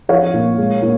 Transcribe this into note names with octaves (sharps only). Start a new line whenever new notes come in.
F3 C#5 F5
A#2
G#3
A#2